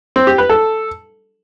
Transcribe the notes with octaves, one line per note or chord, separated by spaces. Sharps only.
C4
G4
B4
A4